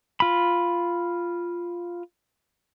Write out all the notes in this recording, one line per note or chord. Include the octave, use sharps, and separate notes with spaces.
F4 B5